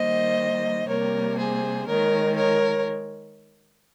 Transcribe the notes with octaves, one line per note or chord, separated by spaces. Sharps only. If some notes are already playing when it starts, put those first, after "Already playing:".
Already playing: D#3 G3 A#3 C5 D#5
C3 G3 A#3 A#4 C#5
G#4 C5
D#3 G#3 A#4 C#5
A#4 C#5